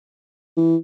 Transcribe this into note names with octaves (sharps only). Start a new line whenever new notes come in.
E3